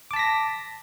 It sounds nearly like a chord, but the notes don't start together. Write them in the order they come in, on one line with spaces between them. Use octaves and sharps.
D6 A5 B6 A#6